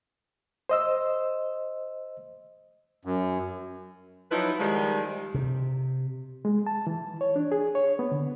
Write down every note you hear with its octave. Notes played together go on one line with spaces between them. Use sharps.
C5 D#5 E6
F#2
F3 F#3 D#4 E4 B4
D#3 F3 G3 G#3
C3
G#3
A5
E3
C#5
D4
G#4
C#5
B3
D3